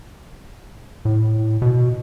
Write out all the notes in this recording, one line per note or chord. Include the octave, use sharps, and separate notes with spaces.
A2
B2